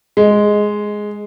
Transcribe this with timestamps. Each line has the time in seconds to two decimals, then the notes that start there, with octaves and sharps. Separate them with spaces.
0.17 G#3